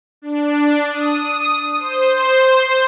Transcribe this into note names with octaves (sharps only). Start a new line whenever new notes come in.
D4
D#6
C5